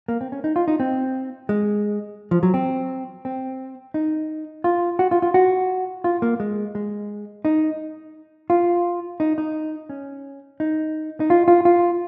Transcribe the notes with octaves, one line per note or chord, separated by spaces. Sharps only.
A#3
C4
C#4
D#4
F4
D#4
C4
G#3
F3
F#3
C4
C4
D#4
F4
F#4
F4
F4
F#4
F4
A#3
G#3
G#3
D#4
F4
D#4
D#4
C#4
D#4
D#4
F4
F4
F4